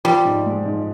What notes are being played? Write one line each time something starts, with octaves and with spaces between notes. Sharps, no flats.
F3 G3
G#2
G#3
G#2